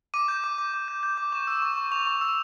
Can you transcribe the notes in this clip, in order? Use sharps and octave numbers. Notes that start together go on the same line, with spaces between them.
D6 D#7
G6
D6
D6
D6
G6
G6
D6
C#6 E7
E6
C#6
C#6
C#6 F7
C#6
E6